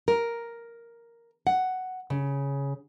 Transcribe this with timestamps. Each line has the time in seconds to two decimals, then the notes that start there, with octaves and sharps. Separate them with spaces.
0.08 A#4
1.47 F#5
2.10 C#3